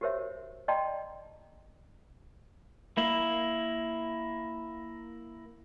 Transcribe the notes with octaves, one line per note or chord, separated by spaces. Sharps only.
F#4 G4 A#4 C5 C#5 E5
D5 D#5 G5 A5 A#5 C6
A#3 E4